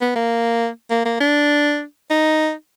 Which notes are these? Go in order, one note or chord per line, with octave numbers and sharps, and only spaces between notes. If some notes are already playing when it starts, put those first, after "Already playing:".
B3
A#3
A#3
A#3
D4
D#4